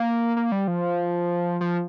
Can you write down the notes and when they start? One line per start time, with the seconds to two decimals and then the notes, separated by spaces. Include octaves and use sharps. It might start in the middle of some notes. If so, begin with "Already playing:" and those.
Already playing: A#3
0.36 A#3
0.52 G3
0.68 F3
1.61 F3